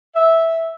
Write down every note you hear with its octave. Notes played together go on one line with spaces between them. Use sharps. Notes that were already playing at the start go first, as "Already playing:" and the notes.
E5